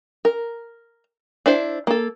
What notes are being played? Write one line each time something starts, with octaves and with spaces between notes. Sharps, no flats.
A#4
D4 E4 C5
A#3 A4